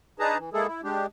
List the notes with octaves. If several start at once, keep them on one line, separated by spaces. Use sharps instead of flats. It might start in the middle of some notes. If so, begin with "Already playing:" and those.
D4 D#4 G#4 B4 A5 A#5
E3
G#3 A#3 E4 G#4 A4
E4
G#3 D4 G4